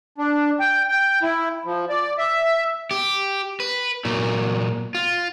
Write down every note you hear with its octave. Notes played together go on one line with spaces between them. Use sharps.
D4
G5
G5
E4
F3
D5
E5
G4
B4
A#2 F#3
F4